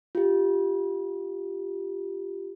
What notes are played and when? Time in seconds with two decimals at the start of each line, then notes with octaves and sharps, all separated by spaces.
0.15 F4 G4